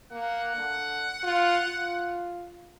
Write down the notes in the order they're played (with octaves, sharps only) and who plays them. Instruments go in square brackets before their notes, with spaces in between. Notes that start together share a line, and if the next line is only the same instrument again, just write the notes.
[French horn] A#3 [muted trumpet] F#5
[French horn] D3
F4
F4